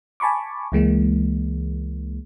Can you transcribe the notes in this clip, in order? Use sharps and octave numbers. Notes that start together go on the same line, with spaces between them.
G#5 A5 B5 C#6 D6
C#2 E3 G#3 A#3